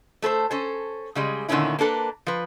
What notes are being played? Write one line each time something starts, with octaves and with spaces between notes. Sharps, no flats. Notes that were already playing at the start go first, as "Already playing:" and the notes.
A3 A4 B4 C5
C#4 A4 C5
C#3 G3 G#3
A#2 D3 D#3 A3 C#4 E4
A#3 D4 A4 B4
F3 B4